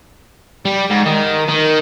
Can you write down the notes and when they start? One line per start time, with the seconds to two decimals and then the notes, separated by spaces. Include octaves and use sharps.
0.65 G3
0.90 G#2
1.06 D#3
1.49 D#3